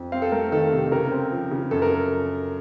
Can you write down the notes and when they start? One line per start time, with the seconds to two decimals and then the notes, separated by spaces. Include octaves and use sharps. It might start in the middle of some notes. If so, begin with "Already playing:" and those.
Already playing: F2
0.12 C4 F5
0.22 A4
0.32 A3 A#4
0.42 A4
0.52 D#3 A4
0.72 C3
0.92 C#3 A#4
1.11 C4
1.32 F3
1.51 C#3
1.71 F#2 A4
1.82 A#4